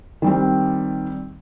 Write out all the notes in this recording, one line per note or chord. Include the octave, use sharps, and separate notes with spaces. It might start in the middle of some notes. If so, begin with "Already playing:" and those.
D#3 G3 C4